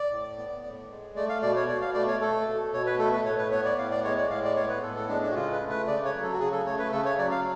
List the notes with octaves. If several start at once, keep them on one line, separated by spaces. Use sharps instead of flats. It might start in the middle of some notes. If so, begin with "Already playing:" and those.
Already playing: D5
A2
B3
A2
G#3
A3 D5
F5
B2 D5
C#5
B2 D5
F5
A3 D5
C#5
A3 A4
B2
B2 C#5
B4
A3 A4
B4
A2 C#5
B4
B3 C#5
D5
A2 F5
D5
G#3 C#5
D5
A2 F5
D5
B3 C#5
B4
A2 A4
A4
G#3 D4
D4
F#4
C#3 F4
B4
A3
B4
C#3 D5
C#5
F#3
A4
F#4
C#3 G#4
A4
A3 C#5
B4
C#3 A4
C#5
F#3 D5
F5